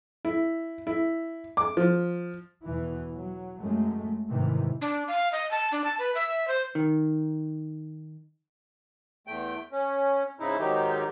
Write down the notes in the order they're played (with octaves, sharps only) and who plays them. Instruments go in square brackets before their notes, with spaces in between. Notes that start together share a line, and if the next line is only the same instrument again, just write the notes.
[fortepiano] E4
E4
D6
F3
[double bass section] E2 B2 E3
F#3
F#2 G#3 A3
G#2 C3 D#3 E3
[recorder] D4
F5
D#5
A5
D4
A5
B4
E5
C5
[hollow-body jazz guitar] D#3
[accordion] E2 A3 G5
C#4
G#2 C#3 D#4 E4
G#2 D#3 F#3 D#4 G4